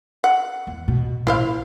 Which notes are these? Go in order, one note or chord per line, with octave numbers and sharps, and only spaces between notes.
F#5
E2
B2
A#1 E4 C5 F5